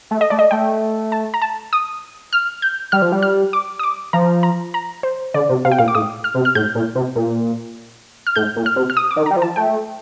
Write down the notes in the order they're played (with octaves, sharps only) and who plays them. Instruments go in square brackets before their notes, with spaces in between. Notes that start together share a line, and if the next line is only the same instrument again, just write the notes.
[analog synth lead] A3
[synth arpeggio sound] D#5
[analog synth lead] A3 [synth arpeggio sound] D5
[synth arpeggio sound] D#5
[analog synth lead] A3 [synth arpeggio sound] G5
[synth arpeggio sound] A5
A#5
A5
D#6
F6
G6
[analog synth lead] G3 [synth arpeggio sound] F6
[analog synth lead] F3
G3
[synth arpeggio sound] F6
D6
D#6
D6
[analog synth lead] F3 [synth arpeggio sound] A#5
[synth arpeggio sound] A#5
A#5
C5
[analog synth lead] D3 [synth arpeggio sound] D5
[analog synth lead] C3
[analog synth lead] C3 [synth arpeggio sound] F5
[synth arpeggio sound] G5
[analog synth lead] A#2 [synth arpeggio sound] F5
[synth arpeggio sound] D6
[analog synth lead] A2 [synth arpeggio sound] D#6
[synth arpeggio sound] F6
[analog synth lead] C3
[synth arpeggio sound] F6
[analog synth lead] A2 [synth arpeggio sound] G6
[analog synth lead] A#2
C3
A#2
[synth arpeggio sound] F6
[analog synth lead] A2 [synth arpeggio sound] G6
[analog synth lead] A#2
[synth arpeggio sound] F6
[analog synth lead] C3
[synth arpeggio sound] F6
D#6
D6
[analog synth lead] D#3
[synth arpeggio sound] A#5
[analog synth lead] G3
F3
[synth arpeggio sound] A5
[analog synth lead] A3 [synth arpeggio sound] G5